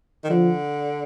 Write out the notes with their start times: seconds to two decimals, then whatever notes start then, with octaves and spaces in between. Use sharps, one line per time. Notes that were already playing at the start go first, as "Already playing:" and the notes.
0.24 D#3
0.30 D3 F3